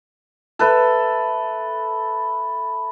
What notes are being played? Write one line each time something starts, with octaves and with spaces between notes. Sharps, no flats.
A4 B4 E5